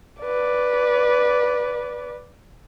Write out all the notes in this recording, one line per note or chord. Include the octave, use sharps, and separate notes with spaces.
B4 D5